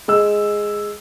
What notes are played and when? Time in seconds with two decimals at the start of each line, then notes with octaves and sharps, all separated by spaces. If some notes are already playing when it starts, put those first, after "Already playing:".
0.08 G#3 E6